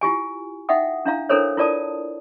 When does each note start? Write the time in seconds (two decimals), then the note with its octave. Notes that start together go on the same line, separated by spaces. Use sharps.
0.01 E4 F4 G4 G#5
0.69 D#4 E5 F#5 G5 D#6
1.05 D4 E4 F5 A#5
1.29 D4 E4 A4 A#4 C5 C#5
1.57 E4 F4 A#4 D5 A5 D#6